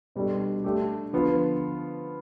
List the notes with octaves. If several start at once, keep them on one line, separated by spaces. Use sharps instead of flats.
B2 G3 D4 A4
A3 D4 G4
D3 F3 B3 F4